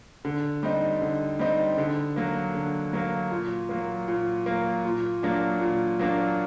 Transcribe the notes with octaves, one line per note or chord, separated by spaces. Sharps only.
D3
G3 C4 D#4
D3
G3 C4 D#4
D3
F#3 A#3
D3
F#3 A#3
A#2
F#3 A#3
A#2
F#3 A#3
A#2
F#3 A#3 D4
A#2
F#3 A#3 D4